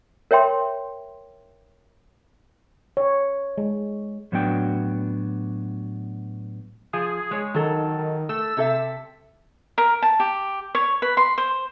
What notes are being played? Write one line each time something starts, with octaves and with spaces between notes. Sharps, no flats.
A#4 C#5 E5 G5 C6
C#5
G#3
A2 F#3 B3 D4 F#4 G5
F3 G#4
G#3 C#5
D#3 F#3 A4
D#3
A3 E6
C3 A4 E5
A#4
A5
G4
C#5
B4
C6
C5